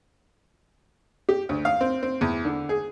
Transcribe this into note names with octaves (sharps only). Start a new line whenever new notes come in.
G4
D2
F5
C4
C4
E2
D3
G#4